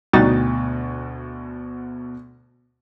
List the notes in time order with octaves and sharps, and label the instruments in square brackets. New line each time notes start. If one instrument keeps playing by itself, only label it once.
[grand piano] D2 B2 A6 [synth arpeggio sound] G3 D#4 F#4